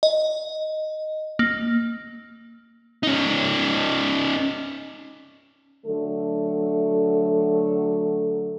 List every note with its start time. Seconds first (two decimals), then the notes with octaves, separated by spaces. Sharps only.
0.03 D#5
1.39 A#3
3.03 C#4 D#4
5.85 D3 F#3 A3 A4